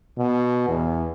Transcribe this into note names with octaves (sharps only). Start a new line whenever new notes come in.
B2
E2